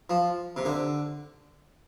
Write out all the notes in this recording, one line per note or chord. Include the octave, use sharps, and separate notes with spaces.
F3
C3
D3